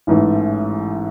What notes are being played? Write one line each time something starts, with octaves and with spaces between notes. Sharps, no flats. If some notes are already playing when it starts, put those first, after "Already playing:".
A1 G#2 E3 A3